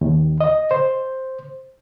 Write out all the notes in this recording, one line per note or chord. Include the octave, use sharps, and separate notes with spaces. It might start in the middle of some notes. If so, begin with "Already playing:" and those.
D#2
D#5
C5